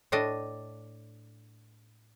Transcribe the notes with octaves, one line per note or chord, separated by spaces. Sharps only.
A2 A3 D4 D#5